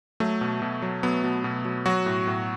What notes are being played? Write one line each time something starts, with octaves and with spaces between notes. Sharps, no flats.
F#3 A3
B2
B2
F#3
F#3 B3
B2
B2
F#3
F#3 F#4
A2
A2